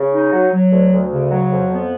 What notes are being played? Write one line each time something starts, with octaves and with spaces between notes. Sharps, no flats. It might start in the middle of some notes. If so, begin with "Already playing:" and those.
Already playing: C#3
D#4
F#3
F#3
D2
D2
C#3
F#3
F2
B3